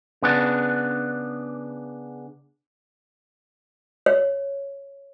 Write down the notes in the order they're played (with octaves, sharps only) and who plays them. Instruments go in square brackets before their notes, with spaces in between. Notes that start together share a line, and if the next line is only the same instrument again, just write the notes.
[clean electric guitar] C#3 B3 D4
[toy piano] C#5